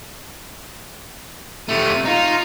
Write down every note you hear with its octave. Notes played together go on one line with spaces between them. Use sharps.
C3 A3 D#7
D#4 F4